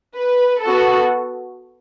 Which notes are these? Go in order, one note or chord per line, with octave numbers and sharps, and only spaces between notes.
B4
B3 F#4 A4